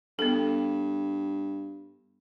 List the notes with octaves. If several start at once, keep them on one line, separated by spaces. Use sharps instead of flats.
G2 B3 A4